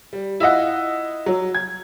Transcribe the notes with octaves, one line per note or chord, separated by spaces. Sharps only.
G3
E4 F4 D#5 F#5
F#3
G#6